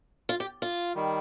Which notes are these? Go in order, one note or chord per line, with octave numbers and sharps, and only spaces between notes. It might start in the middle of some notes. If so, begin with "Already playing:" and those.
F4
G4
F4
D#3 G3